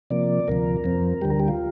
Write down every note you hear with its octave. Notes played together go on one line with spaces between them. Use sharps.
C3 F3 A#3 D5
D2 C3 F3 A#4
F2 F3 C4
D2 D3 G3 G4
A#4
G4
F4